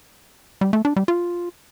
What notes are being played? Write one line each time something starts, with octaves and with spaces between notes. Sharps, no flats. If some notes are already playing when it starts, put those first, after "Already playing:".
G3
A3
D4
G3
F4